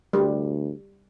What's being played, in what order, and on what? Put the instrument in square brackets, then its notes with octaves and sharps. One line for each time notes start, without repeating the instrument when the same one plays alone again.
[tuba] D2 [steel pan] G3